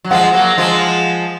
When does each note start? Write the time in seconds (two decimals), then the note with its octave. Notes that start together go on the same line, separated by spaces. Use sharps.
0.04 F#3
0.11 F3 G#3 F#5
0.34 F#3 A#3
0.58 F3 G#3